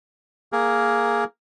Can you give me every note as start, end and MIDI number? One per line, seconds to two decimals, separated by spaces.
0.52 1.24 58
0.52 1.24 68
0.52 1.24 70